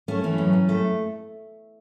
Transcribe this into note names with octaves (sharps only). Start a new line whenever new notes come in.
A3 C#4
E3 C#4
F#2
F#2
A3